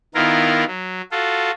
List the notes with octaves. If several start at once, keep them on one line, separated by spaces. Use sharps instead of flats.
D#3 B3 E4 F4 A#4
F#3
F4 F#4 A4